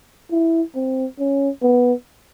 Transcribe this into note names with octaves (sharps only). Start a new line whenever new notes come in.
E4
C4
C#4
B3